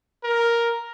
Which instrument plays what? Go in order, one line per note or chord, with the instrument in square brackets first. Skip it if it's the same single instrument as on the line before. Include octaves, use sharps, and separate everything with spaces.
[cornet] A#4